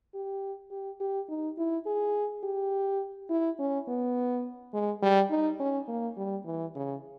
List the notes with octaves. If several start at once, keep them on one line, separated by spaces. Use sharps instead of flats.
G4
G4
G4
D#4
E4
G#4
G4
E4
C#4
B3
G#3
G3
D#4
C#4
A#3
G3
E3
C#3